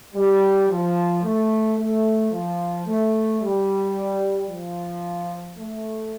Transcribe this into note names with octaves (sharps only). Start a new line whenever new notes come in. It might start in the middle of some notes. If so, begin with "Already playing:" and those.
G3
F3
A3
A3
F3
A3
G3
F3
A3